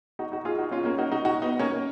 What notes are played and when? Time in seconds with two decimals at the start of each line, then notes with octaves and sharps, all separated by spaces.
0.19 D#4 F#4
0.32 D#4 F#4
0.45 F4 G#4
0.58 D#4 F#4
0.71 C#4 F4
0.85 A#3 C#4
0.98 D#4 F#4
1.12 D#4 F#4
1.25 D#4 F#4
1.42 B3 D#4
1.59 A#3 C#4